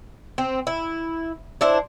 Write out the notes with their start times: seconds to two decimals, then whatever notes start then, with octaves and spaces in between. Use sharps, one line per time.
0.38 C4
0.67 E4
1.61 D4 E4 C5